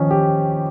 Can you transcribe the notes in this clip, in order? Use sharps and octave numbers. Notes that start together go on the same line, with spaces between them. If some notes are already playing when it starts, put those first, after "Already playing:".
Already playing: D#3 F3 C#4
G4